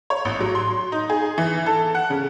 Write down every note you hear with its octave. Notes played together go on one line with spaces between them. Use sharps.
C#5
A1
F#3
C6
D#4
G#4
E3
A4
F#5
C#3